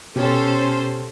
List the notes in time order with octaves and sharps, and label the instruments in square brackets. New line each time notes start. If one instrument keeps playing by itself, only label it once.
[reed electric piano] B2 G4 [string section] C#4 A4 C5